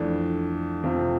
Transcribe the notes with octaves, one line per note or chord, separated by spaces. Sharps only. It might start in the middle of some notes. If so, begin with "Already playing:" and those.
Already playing: F2 E3 A3 D4
F2 C3 F3 C4 F4